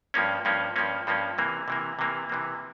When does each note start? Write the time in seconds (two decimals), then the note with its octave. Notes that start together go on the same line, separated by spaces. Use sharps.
0.14 G2 F3 A#3 C#4
0.45 G2 F3 A#3 C#4
0.76 G2 F3 A#3 C#4
1.07 G2 F3 A#3 C#4
1.38 C3 E3 A#3
1.68 C3 E3 A#3
1.99 C3 E3 A#3
2.29 C3 E3 A#3